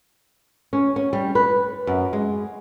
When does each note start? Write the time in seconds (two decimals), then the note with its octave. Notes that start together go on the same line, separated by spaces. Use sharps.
0.73 C#4
0.96 C#4
1.13 G3
1.35 B4
1.87 F#2
2.13 G#3